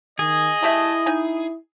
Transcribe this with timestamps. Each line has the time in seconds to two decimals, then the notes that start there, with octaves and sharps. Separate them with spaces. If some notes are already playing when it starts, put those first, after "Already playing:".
0.19 D#3 G#4 D#5
0.63 A3 E4 G4 E5
1.06 D#4 G#5